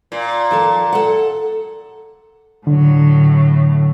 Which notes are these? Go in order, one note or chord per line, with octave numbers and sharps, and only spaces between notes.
A#2
D#3 F3 A4
A4 F#5
A2 D3 F#3